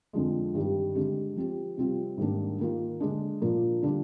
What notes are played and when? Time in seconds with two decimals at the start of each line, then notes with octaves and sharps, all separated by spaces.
0.13 F2 D3 F3 G#3
0.54 G2 D#3 G3
0.95 D3 G#3 C4 G4
1.36 F3 C4 G4
1.77 C3 G3 C4 F4
2.18 G#2 D#3 G3 A#3 D4
2.59 D#3 A#3 F4
3.00 D3 G#3 D4
3.41 A#2 F3 A#3 D4
3.82 D3 G3 D4 F4